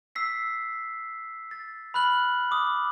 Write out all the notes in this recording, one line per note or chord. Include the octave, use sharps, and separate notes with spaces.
E6 B6 C7
A6
B5 F6 F#6 F#7
D6 D#6